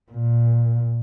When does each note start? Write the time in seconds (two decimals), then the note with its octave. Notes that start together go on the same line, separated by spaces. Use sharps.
0.12 A#2